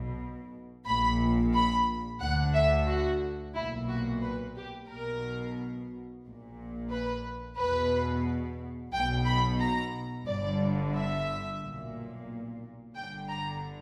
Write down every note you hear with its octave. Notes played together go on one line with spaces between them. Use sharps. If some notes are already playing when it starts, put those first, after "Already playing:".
Already playing: B1 B2
A#1 A#2 B5
B5
D2 D3 F#5
E5
F#4
B1 A#2 E4
F#4
B4
G4
B1 B2 A#4
A#1
A#2
B4
E2 B2 B4
B1 B2 G5
B5
A#5
G1 G2 D3 D5
E5
B1 A#2
G1 G2 D3 G5
A#5